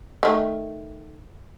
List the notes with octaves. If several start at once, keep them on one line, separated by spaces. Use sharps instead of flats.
D#3 A3